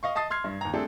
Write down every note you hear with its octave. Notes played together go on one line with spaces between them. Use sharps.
D#5 F5 C#6
D#5 A5 D#6 A6 C7
C6 F6 G#6 C7
G2
D#2 A#5
G3 A3 C4 D4 G#4 A4